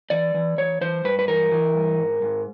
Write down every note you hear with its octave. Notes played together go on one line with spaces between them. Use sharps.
E3 D5
E3
E3 C#5
E3 C5
G2 B4
B4
E3 A#4
E3
G2
G#2
G#2